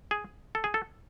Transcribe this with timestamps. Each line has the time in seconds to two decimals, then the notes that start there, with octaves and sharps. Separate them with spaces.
0.11 G#4
0.55 A4
0.64 G#4
0.74 A4